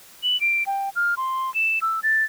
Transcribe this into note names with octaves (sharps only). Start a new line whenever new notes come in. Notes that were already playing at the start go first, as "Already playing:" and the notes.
F#7
D7
G5
F6
C6
E7
E6
A6